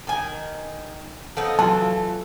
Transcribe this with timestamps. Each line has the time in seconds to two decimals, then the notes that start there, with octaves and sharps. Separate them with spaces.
0.07 D#3 G#5
1.37 F3 B3 D#4 A4
1.59 E3 F#3 A3 F4 A5